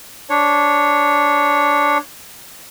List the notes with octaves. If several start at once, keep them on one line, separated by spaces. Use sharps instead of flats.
D4 C#5